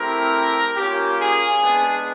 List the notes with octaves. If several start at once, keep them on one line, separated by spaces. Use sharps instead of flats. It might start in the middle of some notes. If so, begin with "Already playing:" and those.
Already playing: A3 C4 E4 G4 A#4
A#3 C#4 F4 G4
G#4
G#3 B3 D4